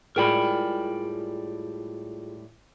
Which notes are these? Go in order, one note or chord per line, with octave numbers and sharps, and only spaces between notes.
A2 G3 G#3 F4 G#4 A#4 G5 B5